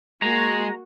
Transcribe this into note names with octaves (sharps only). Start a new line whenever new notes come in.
G#3 A#3 F#4 A#5